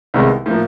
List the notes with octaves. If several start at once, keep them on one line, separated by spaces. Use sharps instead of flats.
C2 C3 D#3 G#3 B3
A2 F3 A#3